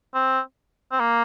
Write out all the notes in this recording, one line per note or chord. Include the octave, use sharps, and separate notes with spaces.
C4
C4
A#3